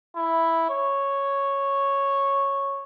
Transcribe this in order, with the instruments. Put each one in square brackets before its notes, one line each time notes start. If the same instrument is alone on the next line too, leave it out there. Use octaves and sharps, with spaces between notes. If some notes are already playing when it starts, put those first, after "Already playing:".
[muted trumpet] E4
C#5